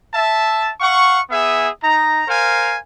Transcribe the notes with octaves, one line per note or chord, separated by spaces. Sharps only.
E5 A5
F5 F#5 C#6
B3 G#4 E5 G#5
D#4 A#5
A#4 C5 F5 G#5